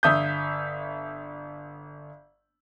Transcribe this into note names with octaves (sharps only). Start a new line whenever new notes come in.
G1 E5 D#6 G6